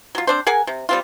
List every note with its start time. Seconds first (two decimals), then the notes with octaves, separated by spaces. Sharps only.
0.15 F#3 F4
0.27 C4 D4 C5
0.47 G#4 A#4 F#5 G#5
0.67 C3
0.89 G3 C4 F4